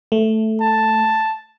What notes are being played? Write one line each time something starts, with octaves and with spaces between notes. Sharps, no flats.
A3
A5